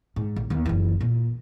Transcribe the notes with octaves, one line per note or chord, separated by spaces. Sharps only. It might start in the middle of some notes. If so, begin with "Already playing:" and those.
G#2
A1
D#2 B3
F#1 E3
A#2